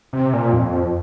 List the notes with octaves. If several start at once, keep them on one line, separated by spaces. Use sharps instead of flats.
C3
A#2
F2